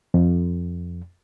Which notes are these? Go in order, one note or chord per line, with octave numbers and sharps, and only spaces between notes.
F2